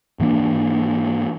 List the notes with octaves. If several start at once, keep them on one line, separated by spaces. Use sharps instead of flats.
G#2 E3 A#3 D4